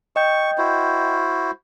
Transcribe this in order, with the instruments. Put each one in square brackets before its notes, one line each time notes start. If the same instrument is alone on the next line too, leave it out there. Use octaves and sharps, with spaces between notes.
[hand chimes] D#5 G5 G6 [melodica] C#6
[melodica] E4 F#4 C5